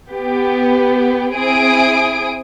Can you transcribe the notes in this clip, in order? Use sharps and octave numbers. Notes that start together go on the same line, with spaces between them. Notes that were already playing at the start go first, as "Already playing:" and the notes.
B3 G4
C4 E4 G#4 G#5 D#6 D7